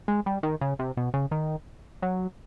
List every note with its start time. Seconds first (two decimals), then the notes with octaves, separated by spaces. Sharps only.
0.08 G#3
0.26 G3
0.43 D#3
0.61 C#3
0.79 C3
0.97 B2
1.14 C#3
1.31 D#3
2.02 F#3